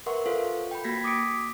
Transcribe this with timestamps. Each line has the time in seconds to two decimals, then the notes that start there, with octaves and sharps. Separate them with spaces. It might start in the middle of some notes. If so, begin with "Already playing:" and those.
0.06 A#4 B4 E5 F#5 C6 C#6
0.26 F4 A4 C5 F5
0.71 G5 B5
0.85 A#3 F#4 G#6 A#6 B6
1.04 D6 D#6 B6 C#7 D7